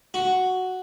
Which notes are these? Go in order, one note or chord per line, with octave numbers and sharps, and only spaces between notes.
F#4